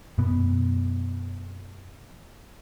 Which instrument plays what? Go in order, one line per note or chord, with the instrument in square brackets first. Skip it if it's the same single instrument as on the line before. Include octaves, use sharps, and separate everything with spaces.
[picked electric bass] F#2 B2 B3